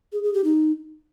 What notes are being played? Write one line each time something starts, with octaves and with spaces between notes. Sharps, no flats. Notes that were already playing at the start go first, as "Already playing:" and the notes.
G#4
G#4
G4
D#4